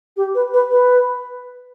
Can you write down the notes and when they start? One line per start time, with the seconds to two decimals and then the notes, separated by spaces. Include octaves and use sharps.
0.16 G4
0.34 B4
0.53 B4
0.71 B4